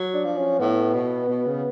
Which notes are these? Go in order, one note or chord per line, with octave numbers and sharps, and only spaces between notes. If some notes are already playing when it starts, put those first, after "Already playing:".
Already playing: F#3
D4
F3
C#4
A2 B3
B2
B2
C#3